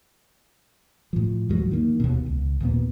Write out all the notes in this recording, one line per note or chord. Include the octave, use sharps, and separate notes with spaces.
A2 F3
D#2 G#2 F3 F#3
D#3 A#3
D#2 B2
C#2
D#2 A#2 B3